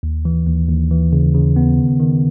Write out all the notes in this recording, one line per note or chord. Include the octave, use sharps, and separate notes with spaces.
D#2
E3
D#2
D#2
E3
C#3
C#3
B3
D#3
D#3